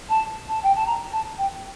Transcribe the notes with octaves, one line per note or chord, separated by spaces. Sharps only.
A5
A5
G5
A5
A#5
A5
G5